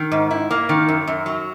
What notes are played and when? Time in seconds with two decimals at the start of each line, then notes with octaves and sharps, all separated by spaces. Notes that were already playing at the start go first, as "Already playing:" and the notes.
Already playing: D#3
0.12 G#2
0.31 E4
0.51 A#3
0.69 D#3
0.89 F#2
1.07 F#2
1.26 F#3